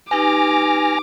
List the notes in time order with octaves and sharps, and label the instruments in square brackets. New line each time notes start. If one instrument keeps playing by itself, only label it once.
[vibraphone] D#4 G4 B4 [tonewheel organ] G#5 F6 A#6 [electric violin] D6